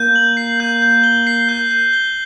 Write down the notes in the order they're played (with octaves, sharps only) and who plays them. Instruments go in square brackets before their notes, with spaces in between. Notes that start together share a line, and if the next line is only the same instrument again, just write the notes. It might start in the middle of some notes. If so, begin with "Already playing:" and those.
Already playing: [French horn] A#3 [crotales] G6
[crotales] F#7
C7
G6
G6
G7
C7
G6
G6
G7